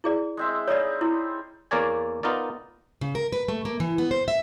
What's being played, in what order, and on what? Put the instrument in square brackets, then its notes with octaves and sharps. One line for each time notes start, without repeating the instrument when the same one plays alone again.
[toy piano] E4 G#4 D5
[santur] G#3 C4 E5
[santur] G3 D#4 G#4 [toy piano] C#5 D5
[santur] C4 [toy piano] E4
[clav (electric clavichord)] E2 A#3 A#4 C#5 D5 G#5
B3 D#4 F4 A#4 D5
[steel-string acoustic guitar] C#3
A#4
B4
A3
A#3
E3
B3
C5
E5